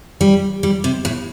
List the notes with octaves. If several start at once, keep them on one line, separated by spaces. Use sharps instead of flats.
G3
G3
C3
A2